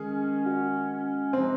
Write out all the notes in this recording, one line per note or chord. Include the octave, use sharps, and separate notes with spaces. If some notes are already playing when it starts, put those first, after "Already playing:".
Already playing: D#3 G#3 C#4 G#4
F#4
C3 F3 G#3 C4 D#4